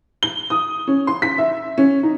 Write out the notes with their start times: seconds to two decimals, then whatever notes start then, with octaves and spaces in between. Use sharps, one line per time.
0.23 G7
0.50 D#6
0.88 C#4
1.07 C6
1.22 B6
1.38 E5
1.78 C#4
2.03 D#4